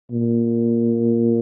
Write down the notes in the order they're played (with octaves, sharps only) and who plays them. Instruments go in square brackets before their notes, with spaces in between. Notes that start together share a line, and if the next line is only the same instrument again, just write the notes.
[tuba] A#2